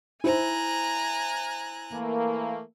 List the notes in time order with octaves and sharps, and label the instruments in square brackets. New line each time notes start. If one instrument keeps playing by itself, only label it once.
[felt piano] E4 C5 [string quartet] G#5 A#5 F#6
[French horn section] E3 A3 A#3